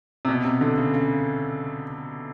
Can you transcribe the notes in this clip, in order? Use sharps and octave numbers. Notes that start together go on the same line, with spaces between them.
C3
B2
C3
D3
C#3
C#3